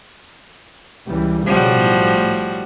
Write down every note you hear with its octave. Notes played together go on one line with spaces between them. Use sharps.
C#2 E3 G3
B1 C#3 F3 G3 F#4
A2